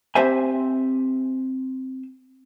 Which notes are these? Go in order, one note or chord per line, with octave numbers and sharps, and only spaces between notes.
C4 G4 C5 E5 G#5